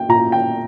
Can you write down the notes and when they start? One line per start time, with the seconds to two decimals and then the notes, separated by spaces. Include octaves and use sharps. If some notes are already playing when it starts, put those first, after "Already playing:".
Already playing: A#3 G5
0.08 A#2 A#5
0.32 G5